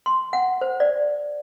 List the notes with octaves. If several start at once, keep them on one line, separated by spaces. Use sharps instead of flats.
C6
F#5
C5
D5